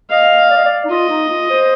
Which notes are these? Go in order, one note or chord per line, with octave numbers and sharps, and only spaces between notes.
D#5 F5
D5
D#5
D5
D#4
F4 D#5
D#4
F4
C5